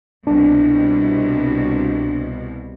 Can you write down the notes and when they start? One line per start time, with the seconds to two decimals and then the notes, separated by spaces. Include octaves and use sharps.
0.27 C2 B2 D4